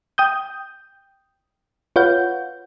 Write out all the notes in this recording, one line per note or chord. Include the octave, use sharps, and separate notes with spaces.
G5 D#6 G6
F4 B4 C#5 F5 F#5 G6